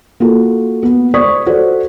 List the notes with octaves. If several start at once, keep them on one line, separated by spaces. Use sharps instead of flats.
A#3 F4 F#4 A4
B3
C5 D5 C#6 D#6 G#6 B6
F#4 A4 C5 D5